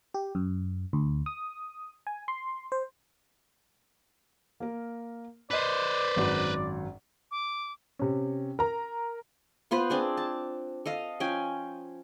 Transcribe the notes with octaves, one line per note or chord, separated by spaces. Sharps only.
G4
F#2
D2
D#6
G#5
C6
C5
A#3 A#4
B4 C5 D5 D#5 B6
G#1 F#2 F#4
D6
C3 C#4
A#4 A#5
B3 F4 B4 C5
C4 D4 G#4
A5
A4 D#5 F5
F3 C#4 G5 G#5